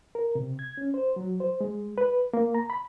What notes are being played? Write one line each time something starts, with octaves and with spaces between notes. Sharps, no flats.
A#4
C3
G#6
C#4
C5
F#3
C5
G#3
B4
A#3
A#5
B5